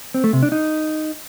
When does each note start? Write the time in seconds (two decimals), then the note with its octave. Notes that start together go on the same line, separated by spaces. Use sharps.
0.14 C4
0.24 A3
0.33 C3
0.42 D4
0.52 D#4